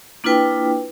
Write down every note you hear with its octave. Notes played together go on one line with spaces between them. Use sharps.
A#3 D4 E4 F4 B4 G5